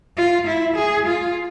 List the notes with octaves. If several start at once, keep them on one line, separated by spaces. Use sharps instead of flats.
F4
E4
G#4
F4